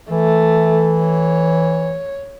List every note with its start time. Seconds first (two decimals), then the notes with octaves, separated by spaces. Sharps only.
0.10 E3 A3
1.04 C#5